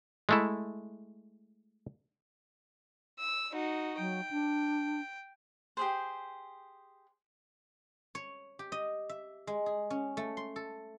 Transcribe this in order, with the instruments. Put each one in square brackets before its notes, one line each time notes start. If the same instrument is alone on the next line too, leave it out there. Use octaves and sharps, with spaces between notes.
[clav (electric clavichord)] G#3 A3 E4
[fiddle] E6
D#4 F#4
[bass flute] F#3 [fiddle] G5
[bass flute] D4
[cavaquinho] G4 G#4 C5
[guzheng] C#5
G4
D#5
E5
G#3
G#4
C#4
A3
C6
A4